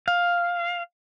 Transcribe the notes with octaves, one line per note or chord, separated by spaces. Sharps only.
F5